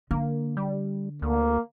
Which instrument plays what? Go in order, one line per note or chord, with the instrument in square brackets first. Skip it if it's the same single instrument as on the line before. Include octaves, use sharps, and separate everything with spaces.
[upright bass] D3 [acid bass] A#3
[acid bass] G3
[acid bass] D2 [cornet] A#3